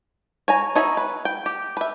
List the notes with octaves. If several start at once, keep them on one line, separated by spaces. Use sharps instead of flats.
C#5 G#5 A#5
D#4 C#5 E5 B5
B4
G5
G4
B4 E5